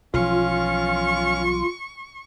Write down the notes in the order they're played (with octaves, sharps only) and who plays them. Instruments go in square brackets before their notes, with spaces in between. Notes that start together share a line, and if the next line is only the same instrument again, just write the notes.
[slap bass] B1 E3 F3 [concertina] C#4 F5 [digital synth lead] F4 [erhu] C#6